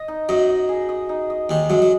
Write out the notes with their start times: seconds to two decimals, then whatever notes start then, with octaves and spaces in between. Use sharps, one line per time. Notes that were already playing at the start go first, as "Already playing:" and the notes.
Already playing: D#5
0.08 D#4
0.29 F#2 F#3 D#5
0.49 D#5
0.69 G#4
0.89 D#5
1.09 D#4
1.30 D#5
1.50 D#2 D#3 G#3
1.70 F#2 F#3 G#3
1.82 F#3